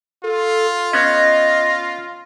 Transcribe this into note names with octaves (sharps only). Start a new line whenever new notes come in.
F4 A4
B3 C#4 D#5 A#6